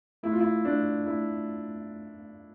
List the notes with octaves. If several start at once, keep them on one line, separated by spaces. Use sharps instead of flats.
A3 E4
F4
E4
A3 D4
A3 E4